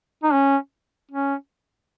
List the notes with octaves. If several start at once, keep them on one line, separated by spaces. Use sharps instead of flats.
D#4
C#4
C#4